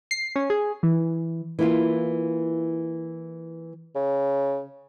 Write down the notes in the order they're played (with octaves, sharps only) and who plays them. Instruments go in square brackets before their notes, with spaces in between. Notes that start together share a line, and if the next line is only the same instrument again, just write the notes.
[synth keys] C7
C#4
G#4
E3
[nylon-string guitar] E3 A#3 E4 F4
[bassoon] C#3